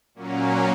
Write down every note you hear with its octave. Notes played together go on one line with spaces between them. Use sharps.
A#2 F#3 A#3 C#4